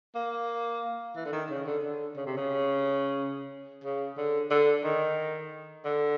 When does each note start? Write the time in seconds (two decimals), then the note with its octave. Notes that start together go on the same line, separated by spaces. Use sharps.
0.15 A#3
1.16 E3
1.25 D3
1.32 D#3
1.50 C#3
1.66 D3
1.84 D3
2.17 C#3
2.26 C3
2.37 C#3
3.84 C#3
4.17 D3
4.51 D3
4.84 D#3
5.85 D3